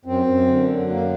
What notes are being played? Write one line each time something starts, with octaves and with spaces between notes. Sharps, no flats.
F#2 C4
F#2
D3
F#3
F#2 A#3